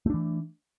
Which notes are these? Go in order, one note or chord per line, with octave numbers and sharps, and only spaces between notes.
E3 A3 D4